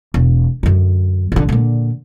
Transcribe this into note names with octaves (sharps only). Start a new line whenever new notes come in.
E1
F#2 D3
A1 D3
A#2 D3